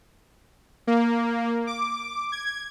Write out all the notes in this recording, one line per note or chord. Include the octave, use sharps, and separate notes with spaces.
A#3
D6
G#6